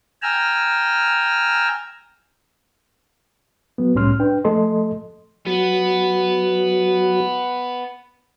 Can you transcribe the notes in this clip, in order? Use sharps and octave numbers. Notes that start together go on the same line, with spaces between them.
G5 G#5 A#5 E6 F6
F#3 B3
C2 A2 G3 C#4 C6 F6
D4 B4 G5
F3 A3 A4 D#5 C6
F#3 B3